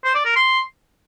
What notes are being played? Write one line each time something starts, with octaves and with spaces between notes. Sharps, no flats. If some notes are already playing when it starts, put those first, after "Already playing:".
C5
D5
A#4
C6